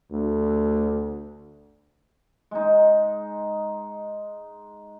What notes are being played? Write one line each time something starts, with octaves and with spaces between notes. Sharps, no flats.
D2
G#3 D#4